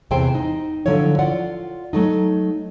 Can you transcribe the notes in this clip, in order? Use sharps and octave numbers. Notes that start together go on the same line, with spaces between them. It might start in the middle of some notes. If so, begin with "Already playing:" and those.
E2 C3 E3 G#4 C5 G5
D#4
D3 F3 F#3 E4 C#5
F4 D5 F#5
F#3 A3 D#4